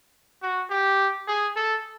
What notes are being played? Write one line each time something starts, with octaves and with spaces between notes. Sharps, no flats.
F#4
G4
G#4
A4